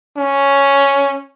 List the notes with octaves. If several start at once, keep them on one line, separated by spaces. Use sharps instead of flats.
C#4